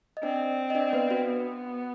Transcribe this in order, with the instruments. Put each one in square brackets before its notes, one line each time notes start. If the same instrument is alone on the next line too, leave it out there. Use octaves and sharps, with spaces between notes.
[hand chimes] D#5
[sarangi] C4 [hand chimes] D4 D5
[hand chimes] D#5
D4 D5
B3 B4
F#4
[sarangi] B3